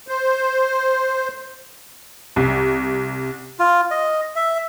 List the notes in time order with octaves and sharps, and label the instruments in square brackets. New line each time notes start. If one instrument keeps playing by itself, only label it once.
[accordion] C5
[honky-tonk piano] C2
[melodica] F4
D#5
E5